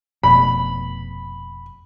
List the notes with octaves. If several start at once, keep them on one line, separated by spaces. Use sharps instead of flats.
F1 B2 B5